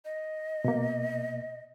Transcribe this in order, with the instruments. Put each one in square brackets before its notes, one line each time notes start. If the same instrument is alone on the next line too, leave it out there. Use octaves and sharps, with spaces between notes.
[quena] D#5
[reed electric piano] B2 A#3